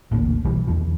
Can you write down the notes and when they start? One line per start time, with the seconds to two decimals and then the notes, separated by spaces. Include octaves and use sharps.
0.11 D#1 A1 A#2 D3
0.45 B1 E3 G3
0.67 E2 D#3 F3